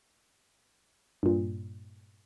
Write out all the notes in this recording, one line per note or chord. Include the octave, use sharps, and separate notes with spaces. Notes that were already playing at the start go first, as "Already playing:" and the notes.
G2 A#2